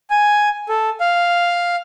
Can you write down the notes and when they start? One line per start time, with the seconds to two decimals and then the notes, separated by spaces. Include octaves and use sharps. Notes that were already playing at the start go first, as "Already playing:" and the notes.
0.10 G#5
0.69 A4
1.00 F5